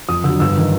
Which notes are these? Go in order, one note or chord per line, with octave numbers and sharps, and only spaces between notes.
F2 D#6
D3 F#3 E6
G1 E6
D#3